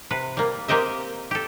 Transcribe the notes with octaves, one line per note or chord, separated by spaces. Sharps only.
C3 B4
G3 A#3
A#3 C4 G4 D#5 E5
G4 A4